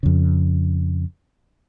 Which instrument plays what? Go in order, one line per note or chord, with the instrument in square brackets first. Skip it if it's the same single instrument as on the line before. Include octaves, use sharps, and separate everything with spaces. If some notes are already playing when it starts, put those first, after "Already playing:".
[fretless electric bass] F2 C#3